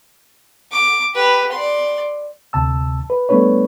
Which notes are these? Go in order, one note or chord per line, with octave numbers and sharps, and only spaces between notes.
D6
G4 B4
D5 C6
D2 C3 A5 E6
B4
G3 A3 B3 D4 B4 C#5